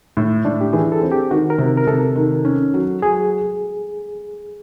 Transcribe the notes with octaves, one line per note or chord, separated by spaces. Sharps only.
A2
A2 D4
G4
E3 G#4
A4
C4
G4
D#3 F#4
A#4
C3
A#4
C3 A4
D#3
C#4
F#3
F#3 G#4